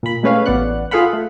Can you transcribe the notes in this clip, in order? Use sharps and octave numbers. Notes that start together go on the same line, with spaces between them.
A#2 B5
G#3 A3 C#4 B4 C#5 F5
A1 B3 D5 F#5 F#6
F4 G#4 A4 F5 F#5 B5
A3